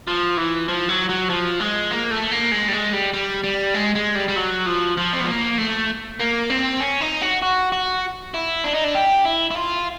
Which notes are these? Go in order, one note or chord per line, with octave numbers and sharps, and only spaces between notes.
F3
E3
F3
F#3
F#3
F3
G#3
A#3
A3
A#3
G#3
G3
G#3
G3
G3
G3
G#3
G#3
G3
G3
F#3
F3
F3
C4
B3
A#3
A3
A#3
C4
C#4
D#4
F#4
F#4
F#4
E4
D4
D#4
D4
G4
E4
E4
F4